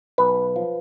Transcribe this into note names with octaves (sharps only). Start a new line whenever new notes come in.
B1 B4
F3